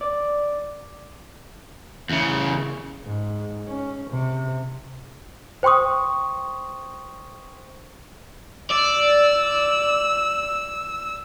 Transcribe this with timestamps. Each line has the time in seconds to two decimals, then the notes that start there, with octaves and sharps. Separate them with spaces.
0.01 D5
2.10 E2 C#3
3.06 G#2
3.67 C#4
4.10 C3
5.63 C5 G5 C6 C#6 D#6
8.71 D5 E6